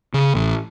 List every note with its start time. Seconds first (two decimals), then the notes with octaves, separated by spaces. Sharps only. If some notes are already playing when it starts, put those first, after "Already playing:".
0.14 C#3
0.35 A1